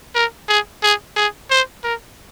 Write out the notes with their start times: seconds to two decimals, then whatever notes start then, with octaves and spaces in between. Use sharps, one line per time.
0.15 A#4
0.48 G#4
0.83 G#4
1.16 G#4
1.50 C5
1.84 A#4